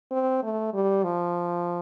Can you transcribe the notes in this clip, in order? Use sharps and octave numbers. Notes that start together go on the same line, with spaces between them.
C4
A3
G3
F3